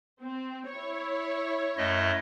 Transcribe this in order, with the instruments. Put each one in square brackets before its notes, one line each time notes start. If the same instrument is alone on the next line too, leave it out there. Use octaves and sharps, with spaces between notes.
[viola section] C4
E4 C#5
[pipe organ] F#2 A3 D#5